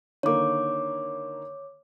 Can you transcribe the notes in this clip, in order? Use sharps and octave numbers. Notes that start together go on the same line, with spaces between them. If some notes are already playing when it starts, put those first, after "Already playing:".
D3 D#3 A#3 C#5 D6